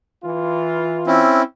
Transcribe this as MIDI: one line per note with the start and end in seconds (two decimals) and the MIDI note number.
0.24 1.24 52
0.24 1.24 65
1.07 1.42 60
1.07 1.42 61
1.07 1.42 64